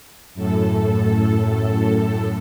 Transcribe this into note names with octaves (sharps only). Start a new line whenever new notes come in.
F#2 A2 A4